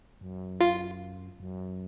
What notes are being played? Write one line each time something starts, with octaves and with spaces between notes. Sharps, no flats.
F#2
F4
F#2